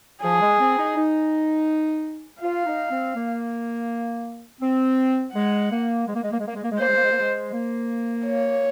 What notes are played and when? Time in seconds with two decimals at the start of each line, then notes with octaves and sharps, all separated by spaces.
0.23 F3 G#4
0.41 G#3
0.59 C4
0.78 D#4
0.96 D#4
2.42 F4 F5
2.66 D#4
2.91 C4
3.15 A#3
4.61 C4
5.34 G#3 F#5
5.70 A#3
6.06 G#3
6.15 A#3
6.23 G#3
6.31 A#3
6.39 G#3
6.47 A#3
6.55 G#3
6.63 A#3
6.71 G#3
6.79 A#3 C5
6.87 G#3
6.95 A#3
7.03 G#3
7.11 A#3
7.19 G#3
7.53 A#3
8.26 C#5